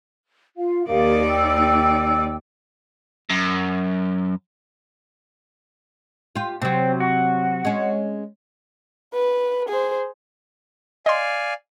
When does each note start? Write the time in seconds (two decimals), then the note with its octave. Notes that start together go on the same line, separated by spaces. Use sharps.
0.57 F4 F5
0.88 D#2 D#4 G4 A#4 D5 F5
1.28 G5 E6
3.30 F#2
6.35 F4 G4
6.62 C3 F#3 C4
7.00 F#4
7.65 G#3 C#4
9.14 B4
9.69 G#4 C5
11.06 D5 D#5 F5 G#5 C6